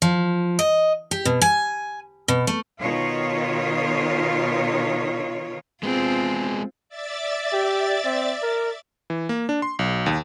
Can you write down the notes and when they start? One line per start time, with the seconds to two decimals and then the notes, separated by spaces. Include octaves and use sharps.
0.02 F3
0.59 D#5
1.11 G4
1.25 B2
1.42 G#5
2.28 B2
2.47 A3
2.80 B2 D#3 F4 C#5
5.83 G#3 B3 C4 F4 G#4
6.89 D5 E5 A6
7.53 G4
8.05 C4
8.42 A#4
9.10 E3
9.29 A#3
9.49 D4
9.62 C6
9.79 B1
10.06 D#2